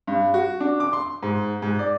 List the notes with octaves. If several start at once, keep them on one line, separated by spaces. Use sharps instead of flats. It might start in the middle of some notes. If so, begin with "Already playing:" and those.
G2
F#4
D4
D6
C6
G#2
G#2
D5